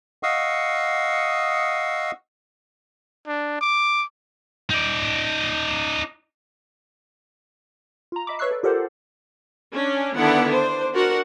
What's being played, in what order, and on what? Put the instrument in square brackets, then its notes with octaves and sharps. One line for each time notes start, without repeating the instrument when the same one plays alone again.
[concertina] D#5 F5 F#5 C#6 D#6 E6
[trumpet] D4
D6
[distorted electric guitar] D#4 D5
[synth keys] F4 A#5
D#5 E5 B5 D6
B4 C#5 C#6 E6 F#6 C7
A4 B4 D5
F4 G4 A4 A#4 C5 F#5
[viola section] C#4 D4
D3 D#3 B3 D4 E4 F#5
D4 C5
D4 F#4 A#4 F#5